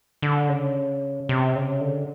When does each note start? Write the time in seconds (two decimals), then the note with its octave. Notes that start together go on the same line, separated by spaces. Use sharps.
0.22 D3
0.49 C#3
1.29 C3
1.56 C#3
1.81 D3